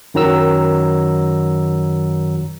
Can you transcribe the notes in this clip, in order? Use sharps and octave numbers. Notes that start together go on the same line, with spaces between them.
F#2 D#3 F#3 A#5 E6